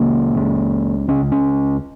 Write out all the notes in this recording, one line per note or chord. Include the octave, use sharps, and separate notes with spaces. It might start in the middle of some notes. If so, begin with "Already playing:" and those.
Already playing: C#2 C#3 A#3
C#2 C#3
C#2 C#3 C#4
C#4